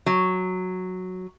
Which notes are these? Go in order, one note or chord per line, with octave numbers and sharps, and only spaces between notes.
F#3